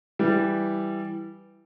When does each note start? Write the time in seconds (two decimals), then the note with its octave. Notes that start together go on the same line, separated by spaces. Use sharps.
0.19 E3 G3